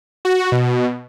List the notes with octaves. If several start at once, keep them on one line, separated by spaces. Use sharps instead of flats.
F#4
B2